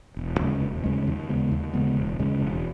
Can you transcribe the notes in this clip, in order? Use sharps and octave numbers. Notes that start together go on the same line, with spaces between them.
E1
D#2 C#3 G#3
E1
D#2 C#3 G#3
D#2
C#3 G#3 B3
D#2
C#3 G#3 B3
E1
D#2 C#3 G#3
E1